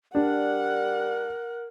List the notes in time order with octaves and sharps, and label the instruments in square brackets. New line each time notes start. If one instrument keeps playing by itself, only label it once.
[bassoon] G3 [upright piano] D4 [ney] A#4 [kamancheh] F#5 F#6